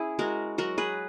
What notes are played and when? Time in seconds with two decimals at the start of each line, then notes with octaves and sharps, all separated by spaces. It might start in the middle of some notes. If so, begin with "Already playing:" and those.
Already playing: C#4 E4 G#4
0.19 G#3 F#4 A#4
0.58 F#3 F#4 A#4
0.78 G#4 B4